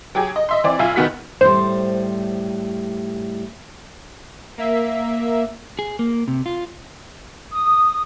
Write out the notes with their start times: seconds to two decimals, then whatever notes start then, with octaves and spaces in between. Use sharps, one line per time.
0.15 F#3 G4 G#4
0.36 D#5
0.49 D#5 E5 C6
0.64 E3 C4 D5
0.79 B1 F4 E5 F5 G#5
0.96 B1 D#3 B3 F#4 B6
1.41 A2 G3 C5
4.57 A#3 E5
5.79 G#4
5.99 A#3
6.28 C3
6.46 F4
7.52 D#6